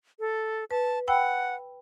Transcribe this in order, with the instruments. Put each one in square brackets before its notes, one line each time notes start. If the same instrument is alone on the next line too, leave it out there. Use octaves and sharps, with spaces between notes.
[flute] A4
[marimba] B4 [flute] A5
[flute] F#5 [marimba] G5 B5 E6